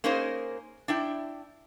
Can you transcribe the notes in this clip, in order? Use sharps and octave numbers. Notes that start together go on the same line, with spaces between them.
A#3 C#4 D#4 G#4 A#4 C5
D4 E4 G5